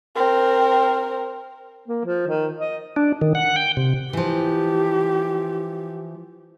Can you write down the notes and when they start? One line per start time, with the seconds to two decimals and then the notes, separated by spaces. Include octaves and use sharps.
0.15 C4 A#4
1.88 A#3
2.05 F3
2.27 D#3
2.61 D#5
2.96 D4
3.21 D#3
3.35 F#5
3.56 G5
3.77 C3
4.13 E3 F3 G4